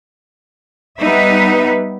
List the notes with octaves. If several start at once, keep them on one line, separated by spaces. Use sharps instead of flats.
G3 B3 D#4 B4 E5